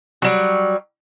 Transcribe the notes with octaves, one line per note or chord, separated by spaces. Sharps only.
F#3 G3